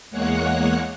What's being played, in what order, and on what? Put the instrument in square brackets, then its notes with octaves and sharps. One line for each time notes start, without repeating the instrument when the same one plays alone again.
[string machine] E2 G#3 A#3 C#5 F#5 F#6